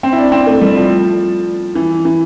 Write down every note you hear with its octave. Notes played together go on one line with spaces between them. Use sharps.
C4
E4
D4
C4
A3
G3
F3
E3
E3